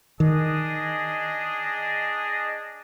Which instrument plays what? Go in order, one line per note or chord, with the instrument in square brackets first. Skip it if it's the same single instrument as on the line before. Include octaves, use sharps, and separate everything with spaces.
[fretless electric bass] D#3 [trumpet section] D4 G#4 D#5